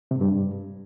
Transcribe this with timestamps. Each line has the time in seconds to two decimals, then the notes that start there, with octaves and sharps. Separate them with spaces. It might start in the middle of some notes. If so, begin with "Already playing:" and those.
0.11 C3
0.16 G#2
0.21 G2